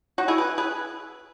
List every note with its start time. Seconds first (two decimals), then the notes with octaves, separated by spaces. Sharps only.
0.18 D#4 F#4
0.28 E4 G#4
0.38 B4
0.58 G#4 B4